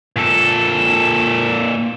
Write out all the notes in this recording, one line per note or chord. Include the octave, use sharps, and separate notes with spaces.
A#2 A4